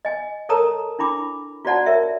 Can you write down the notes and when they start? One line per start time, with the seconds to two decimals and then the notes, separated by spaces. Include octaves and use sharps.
0.05 D#5 G#5
0.49 A4 A#4 C#5 A5 A#5 D#6
0.99 D4 E4 B5 D6
1.65 F4 F#4 C5 D5 F#5 A5
1.86 A#4 C#5 E5